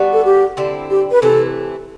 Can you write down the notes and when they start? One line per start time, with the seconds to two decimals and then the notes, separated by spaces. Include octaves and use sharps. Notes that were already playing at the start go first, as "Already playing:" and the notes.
Already playing: G3 B3 D4 F#4
0.13 A4
0.25 G4
0.57 D3 G3 C4 E4
0.90 G4
1.11 B4
1.22 C3 E3 A3 E4 A4